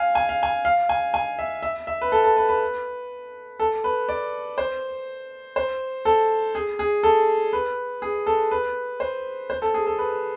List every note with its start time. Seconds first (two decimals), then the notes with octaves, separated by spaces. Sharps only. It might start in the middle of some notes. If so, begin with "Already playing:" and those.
Already playing: F5 G#5
0.15 G#5
0.29 F5
0.43 G#5
0.65 F5
0.89 G#5
1.14 G#5
1.39 E5
1.63 E5
1.87 E5
2.02 B4
2.12 A4
2.24 A4
2.37 B4
2.49 B4
3.60 A4
3.84 B4
4.09 D5
4.58 C5
5.56 C5
6.05 A4
6.55 G#4
6.79 G#4
7.03 A4
7.53 B4
8.02 G#4
8.27 A4
8.51 B4
9.00 C5
9.50 C5
9.62 A4
9.74 G#4
9.86 A4
9.99 B4